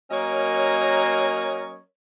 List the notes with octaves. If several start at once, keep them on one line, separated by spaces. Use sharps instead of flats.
F#3 A#3 C#4 A#4 C#5 D#5